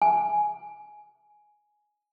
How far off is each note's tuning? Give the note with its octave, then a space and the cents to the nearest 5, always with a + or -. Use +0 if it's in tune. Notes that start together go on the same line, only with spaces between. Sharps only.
G#5 +10